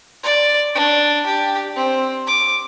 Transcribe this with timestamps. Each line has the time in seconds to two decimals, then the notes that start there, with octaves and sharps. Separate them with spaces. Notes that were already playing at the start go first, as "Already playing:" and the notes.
0.24 D5
0.75 D4
1.26 G4
1.77 C4
2.27 D6